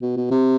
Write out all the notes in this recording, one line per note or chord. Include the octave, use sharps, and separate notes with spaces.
B2
B2
C3